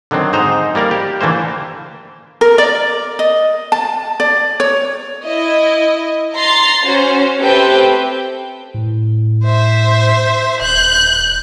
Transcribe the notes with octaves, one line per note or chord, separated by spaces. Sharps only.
D3 D#3 F#3 C4
G#2 D#4 C5 A#5
G3 A#3 A#4 D5
G4
D3 E3 A3 A#3 C5
A#4
D5
D#5
A5
D5
C#5
E4 D#5
A#5 C6 A6 C7
C#4 F#4 C5
A3 C4 G4 B4 C5 G5
A2
C5 E5
D#1 F#6 G6